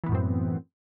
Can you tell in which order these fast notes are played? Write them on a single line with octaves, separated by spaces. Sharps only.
E3 B3 A2 F#2 C4